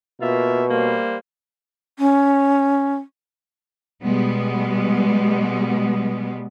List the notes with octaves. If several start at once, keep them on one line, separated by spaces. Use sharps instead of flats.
B2 A#3 F4 E5
G3 A#3 C5
C#4
B2 G3 G#3 B3